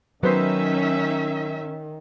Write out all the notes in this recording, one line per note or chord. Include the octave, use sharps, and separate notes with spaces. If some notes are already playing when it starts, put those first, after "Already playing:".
D#3 F#3 B3 C#4 D#4 C5 E5